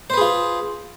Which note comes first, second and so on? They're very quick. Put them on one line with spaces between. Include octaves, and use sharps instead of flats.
C5 B4 G#4 F4